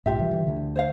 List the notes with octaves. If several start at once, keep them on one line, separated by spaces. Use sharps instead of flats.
B1 G#2 F4 G4 E5
D3 E3 G3
D3 E3
D2 D3
C5 C#5 F5